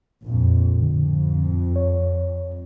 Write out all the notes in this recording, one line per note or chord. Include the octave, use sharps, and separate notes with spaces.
A#1 F2
F2 A2 D3
C#5